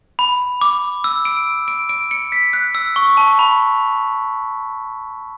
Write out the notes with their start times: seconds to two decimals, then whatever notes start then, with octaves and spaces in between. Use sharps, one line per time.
0.19 B5
0.61 D6
1.04 E6
1.25 D7
1.68 D7
1.89 D7
2.11 C#7
2.32 B6
2.53 F#6
2.75 E6
2.96 C#6
3.17 A5
3.39 B5